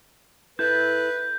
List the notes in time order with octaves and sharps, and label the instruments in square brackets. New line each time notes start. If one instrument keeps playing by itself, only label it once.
[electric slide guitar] E4 A4 E5 [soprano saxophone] B4 [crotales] G6